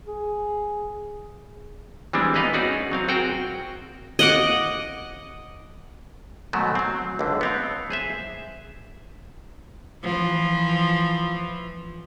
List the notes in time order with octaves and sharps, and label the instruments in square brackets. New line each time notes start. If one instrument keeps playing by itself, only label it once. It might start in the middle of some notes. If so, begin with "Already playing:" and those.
[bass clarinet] G#4
[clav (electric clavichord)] E3 G3 G#3 C4 D4
A#3 B3 D#4 B4 D#5 F5
C#4 D#4 F#4 G#4 D5
F#3 C4 F5
C4 F#4 G#4 A#4 G5
[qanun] D#5 F#5 D6
[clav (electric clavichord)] G#2 B2 D#3 F#3 A3
F#3 C4
C#2 D3
B3 C4 F5
G#4 C5 E5
[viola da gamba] E3 F3